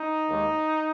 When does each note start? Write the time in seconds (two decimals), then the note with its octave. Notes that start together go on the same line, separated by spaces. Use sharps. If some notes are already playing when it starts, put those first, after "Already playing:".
Already playing: D#4
0.27 D#2 D#3 G#3